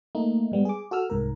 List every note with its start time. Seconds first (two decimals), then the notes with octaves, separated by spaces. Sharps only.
0.15 A3 A#3 D#4
0.52 G#2 G3 B3
0.65 G#4 D6
0.91 F#4 A4 E6 F6
1.10 C2 G#2 A#4